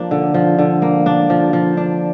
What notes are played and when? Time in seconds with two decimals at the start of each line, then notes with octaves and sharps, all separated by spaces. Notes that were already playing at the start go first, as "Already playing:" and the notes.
Already playing: F3 A#3 D4
0.11 D3
0.34 F3
0.59 D3
0.82 A#3
1.06 D4
1.30 F3
1.53 F3
1.77 D4